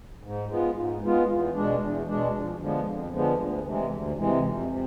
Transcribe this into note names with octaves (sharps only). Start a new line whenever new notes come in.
G#2
G#3 B3 F4
G#2
G#3 B3 F4
E2
B2 G#3 D4
E2
B2 G#3 D4
F2
D3 F3 G#3 B3
F2
D3 F3 G#3 B3
D2
C3 E3 G#3
D2
C3 E3 G#3
F2
C3